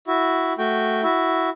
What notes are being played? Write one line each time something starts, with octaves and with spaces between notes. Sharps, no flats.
E4 F#4
A3 F#4 G5
E4 F#4